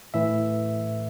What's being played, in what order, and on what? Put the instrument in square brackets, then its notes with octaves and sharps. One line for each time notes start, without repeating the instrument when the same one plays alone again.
[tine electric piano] A2 E3 E5